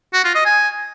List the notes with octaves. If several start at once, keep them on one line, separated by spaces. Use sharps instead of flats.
F#4
F4
D#5
G#5